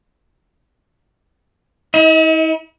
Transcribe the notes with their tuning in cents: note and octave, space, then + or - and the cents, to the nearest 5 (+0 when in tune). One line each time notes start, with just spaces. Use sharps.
E4 -45 D#5 +30